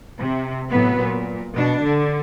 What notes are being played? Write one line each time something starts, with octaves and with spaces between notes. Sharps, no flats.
C3
A2 F#3 B3
A#2
B2 D4
D3